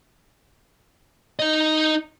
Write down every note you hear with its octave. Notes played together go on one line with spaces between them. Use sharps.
D#4 D#5